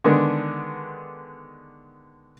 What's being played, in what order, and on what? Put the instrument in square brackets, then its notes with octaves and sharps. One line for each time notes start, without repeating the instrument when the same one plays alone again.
[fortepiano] D3 D#3 G#3 B3 D4